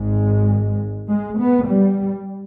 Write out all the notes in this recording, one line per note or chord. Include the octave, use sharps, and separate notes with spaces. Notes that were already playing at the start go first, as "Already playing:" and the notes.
Already playing: G#1 G#2 G#3
G#3
B3
G3